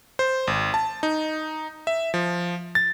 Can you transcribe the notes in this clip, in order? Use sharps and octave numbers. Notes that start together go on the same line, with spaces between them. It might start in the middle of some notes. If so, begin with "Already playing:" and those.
C5
G#1
A5
D#4
E5
F3
A6